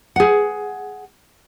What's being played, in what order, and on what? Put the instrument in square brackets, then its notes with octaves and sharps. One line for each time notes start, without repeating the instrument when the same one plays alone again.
[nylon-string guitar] G#4 F#5